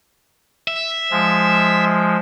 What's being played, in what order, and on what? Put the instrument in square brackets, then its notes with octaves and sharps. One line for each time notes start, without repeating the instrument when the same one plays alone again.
[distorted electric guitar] E5
[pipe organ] F3 G#3